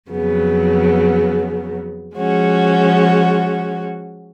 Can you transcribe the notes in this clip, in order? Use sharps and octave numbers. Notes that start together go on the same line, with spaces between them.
F2 C#3 F#3 B3
F3 G#3 C#4 F#4